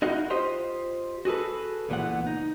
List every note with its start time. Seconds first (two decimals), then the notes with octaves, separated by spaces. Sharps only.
0.02 D#4 E4 F#4 D#5 F5 F#5
0.30 F4 G4 C5 D#5
1.25 F#4 G#4 A4 B4
1.89 C#2 A#2 E3 B3 F#5
2.27 D#4